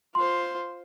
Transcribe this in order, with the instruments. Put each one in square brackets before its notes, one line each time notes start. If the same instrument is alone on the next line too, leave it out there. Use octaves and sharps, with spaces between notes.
[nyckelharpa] F4 C5 [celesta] C6